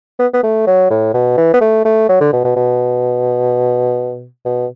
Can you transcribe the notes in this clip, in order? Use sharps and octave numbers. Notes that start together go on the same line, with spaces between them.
B3
B3
A3
F#3
A2
B2
E3
B3
A3
A3
F#3
D3
B2
B2
B2
B2